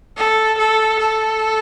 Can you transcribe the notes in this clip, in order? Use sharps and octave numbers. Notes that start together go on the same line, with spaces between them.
A4
A4
A4